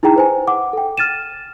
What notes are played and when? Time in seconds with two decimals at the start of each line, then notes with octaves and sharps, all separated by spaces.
0.03 D#4 E4 G#4 G5 A#5
0.16 B4 C5 G#5
0.47 F#5 D6
0.73 A4 G5
0.98 F6 A6 D#7 E7